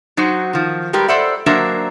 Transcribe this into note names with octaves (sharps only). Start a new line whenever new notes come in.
F#3 D#4 F#4 C5
D#3 F3
G3 G#3 G4 A#4 B4
A4 C5 D5 E5 F#5
F#3 A#3 D4 A#4 C5 E5